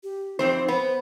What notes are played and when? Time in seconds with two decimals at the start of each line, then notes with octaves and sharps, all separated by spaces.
0.03 G4
0.39 F2 C4 D#4 C5
0.68 B3 C5